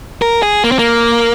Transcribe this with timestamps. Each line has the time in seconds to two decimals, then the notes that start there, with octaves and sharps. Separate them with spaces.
0.22 A#4
0.43 G#4
0.64 A#3
0.72 C4
0.79 A#3